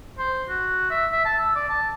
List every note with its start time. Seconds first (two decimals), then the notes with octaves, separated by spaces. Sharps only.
0.18 C5
0.49 F#4
0.90 E5
1.12 E5
1.25 A5
1.39 E6
1.56 D5
1.69 A5